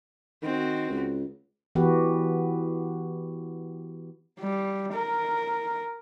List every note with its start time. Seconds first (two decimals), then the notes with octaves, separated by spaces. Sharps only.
0.43 D#3 C4 F#4
0.90 C#2
1.75 E3 B3 F#4 G4 B4
4.39 G3
4.93 A#4